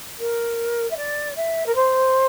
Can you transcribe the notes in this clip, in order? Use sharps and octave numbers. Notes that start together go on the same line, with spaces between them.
A#4
E5
D5
E5
A#4
C5